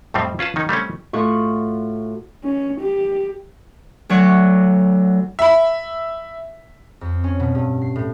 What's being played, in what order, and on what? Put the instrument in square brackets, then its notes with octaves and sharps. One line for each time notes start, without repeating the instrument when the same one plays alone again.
[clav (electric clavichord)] F2 A2 G3 C4
C#4 F4 B4 A5
D#3 C#4 D#4
G3 A3 C4 C#4
[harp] A2 F4 F#4 C#6
[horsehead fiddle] C#4
G4
[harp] D2 F#3 C#6 F#6
[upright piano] E5 B5
[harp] F2
C#4
B2
G2
C7
A2